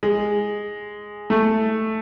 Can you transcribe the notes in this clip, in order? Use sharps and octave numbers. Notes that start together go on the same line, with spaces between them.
G#3
A3